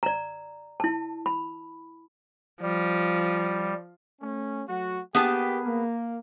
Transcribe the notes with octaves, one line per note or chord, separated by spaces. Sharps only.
D5 A#5
E4 A5
B5
F3 G3
A3 C#4
F#3 A3 F#4
A#3 B3 G4 G#4 A5
A#3